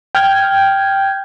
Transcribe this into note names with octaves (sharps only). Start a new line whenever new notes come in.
G5 F6 G6 G#6